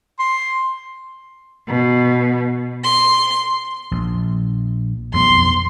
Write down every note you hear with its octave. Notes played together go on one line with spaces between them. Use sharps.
C6
B2
C6
A#1
B1 F2 B3 C6